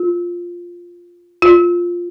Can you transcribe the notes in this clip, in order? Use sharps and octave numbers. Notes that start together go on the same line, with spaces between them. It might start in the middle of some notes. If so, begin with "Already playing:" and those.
Already playing: F4
F4